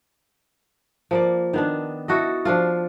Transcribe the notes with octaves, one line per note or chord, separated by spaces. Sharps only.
F3 A#3 D5
D#3 B3 D4
E4 F#4 A4 D#5
F3 D4 F4